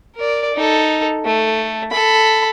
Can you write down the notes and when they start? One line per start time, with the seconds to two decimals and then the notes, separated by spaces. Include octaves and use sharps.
0.16 A#4 D5
0.54 D#4 A4
1.26 A3
1.91 A4 B5